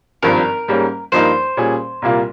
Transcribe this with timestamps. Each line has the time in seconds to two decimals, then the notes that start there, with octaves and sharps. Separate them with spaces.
0.23 G#1 G2 F3 A#4
0.68 G#2 G3 A#3 C#4
1.12 G2 F3 A#3 D#4 C5
1.57 A#2 G3 C#4 G#4
2.02 C2 A#2 G3 A#3 F4